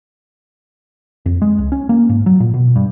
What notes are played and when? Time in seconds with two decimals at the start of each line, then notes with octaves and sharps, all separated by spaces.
1.26 F2
1.42 G#3
1.59 C#2
1.72 C#4
1.89 A#3
2.09 G#2
2.26 F#3
2.40 A#2
2.54 B2
2.76 G2